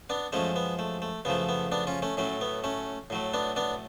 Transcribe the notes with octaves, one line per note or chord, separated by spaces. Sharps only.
B3 D4
F#2 F3 G#3 A3 C#4
B3
A3
A3
F#2 C#3 F3 A3 B3
B3
B3 D4
C#4 F4
A3 C#4
A2 F#3 A3 C#4
B3
A3 C#4
A2 F#3 A3
B3 D4
B3 D4